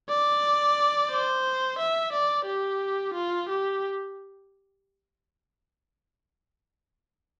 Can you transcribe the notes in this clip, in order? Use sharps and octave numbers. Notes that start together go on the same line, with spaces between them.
D5
C5
E5
D5
G4
F4
G4